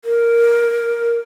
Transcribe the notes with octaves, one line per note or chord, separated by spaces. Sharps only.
A#4